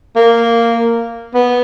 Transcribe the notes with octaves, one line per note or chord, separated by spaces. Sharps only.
A#3
B3